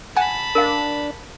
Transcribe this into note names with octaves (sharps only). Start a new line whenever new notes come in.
F#5 G#5 A5 B5
D4 A#4 F5